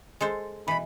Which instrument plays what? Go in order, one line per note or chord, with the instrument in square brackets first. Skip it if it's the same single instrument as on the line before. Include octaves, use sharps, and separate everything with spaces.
[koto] G#3 A4 C5
[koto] B2 E3 [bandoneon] B5